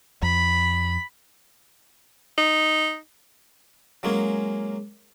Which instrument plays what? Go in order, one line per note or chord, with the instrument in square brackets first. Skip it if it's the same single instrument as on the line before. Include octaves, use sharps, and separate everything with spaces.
[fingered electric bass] F2 [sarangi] B5
[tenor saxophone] D#4
[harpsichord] F#3 G#3 A#3 C#4